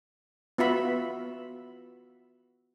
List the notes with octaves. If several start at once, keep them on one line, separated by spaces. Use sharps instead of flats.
B3 F4 F#4 E5 B5